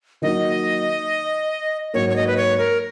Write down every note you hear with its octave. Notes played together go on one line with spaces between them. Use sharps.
D#3 F#3 A#3 D#4 D#5
G#2 F#3 A#3 C#5
C#5
D#5
B4
C#5
A#4